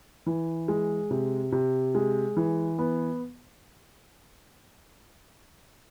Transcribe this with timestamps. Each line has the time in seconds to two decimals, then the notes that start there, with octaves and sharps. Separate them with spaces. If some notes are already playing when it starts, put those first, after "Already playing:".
0.26 E3
0.68 G#3
1.11 C3
1.52 C3
1.95 G#3
2.37 E3
2.79 B3